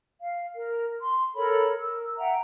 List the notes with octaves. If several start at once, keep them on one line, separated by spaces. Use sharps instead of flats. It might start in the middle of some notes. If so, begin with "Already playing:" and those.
F5
A#4
C6
A4 A#4 C#5 B5
A#4 E6
E5 F#5 G5 A#5